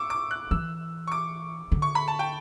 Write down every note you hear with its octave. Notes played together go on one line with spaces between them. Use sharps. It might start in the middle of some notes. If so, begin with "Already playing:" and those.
Already playing: C#6 D6 E6
D6
F#6
E3 E6
C#6
D6
D3
C#6
B5
A5
G5